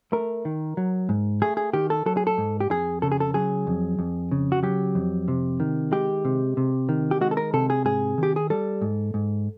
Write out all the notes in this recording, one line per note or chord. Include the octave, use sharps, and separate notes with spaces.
A3 A#4
D#3
F#3
G#2
A3 G#4
G#4
D#3 G4
A4
F#3 A4
G#4
A4
G#2
G4
F2 G#4
C#3 A4
G#4
A4
F#3 G#4
F2
F2
C#3
F#4
F#3 G4
F2
C3
D#3
G#3 G4
C3
C3
D#3
G4
G#3 F#4
A4
A#4
C3 A4
G#4
G#2 G#4
D#3 G4
G#4
G3 A4
G#2
G#2